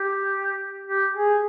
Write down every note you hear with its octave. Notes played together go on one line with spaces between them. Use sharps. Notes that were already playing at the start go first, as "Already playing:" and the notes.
Already playing: G4
G4
G#4